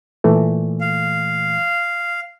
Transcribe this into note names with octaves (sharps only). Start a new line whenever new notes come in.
A#2 E3 A3
F5